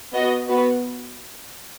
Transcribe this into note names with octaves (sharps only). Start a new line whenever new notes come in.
B3 F#4 D#5
B3 F#4 B4